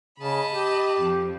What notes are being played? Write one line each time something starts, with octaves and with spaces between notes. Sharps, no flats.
C#3 D#5 A5 B5
G4
F2